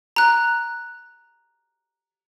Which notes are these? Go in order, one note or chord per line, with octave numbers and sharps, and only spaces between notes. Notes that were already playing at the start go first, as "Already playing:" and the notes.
A#5 F#6